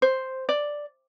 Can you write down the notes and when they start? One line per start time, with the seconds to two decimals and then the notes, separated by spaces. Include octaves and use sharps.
0.02 C5
0.49 D5